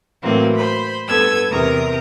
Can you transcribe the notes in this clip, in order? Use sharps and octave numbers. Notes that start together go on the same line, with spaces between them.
A2 E3 F#3 A#3 C4
C5 B5
G2 B3 A4 E6 G#6
E2 C3 A#4 A#5 D#6